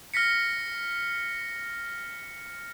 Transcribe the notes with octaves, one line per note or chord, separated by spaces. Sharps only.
F6 A#6 B6 C#7